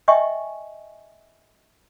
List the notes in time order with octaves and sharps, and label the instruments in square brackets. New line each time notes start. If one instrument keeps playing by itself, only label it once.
[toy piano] D#5 E5 G5 G#5 C#6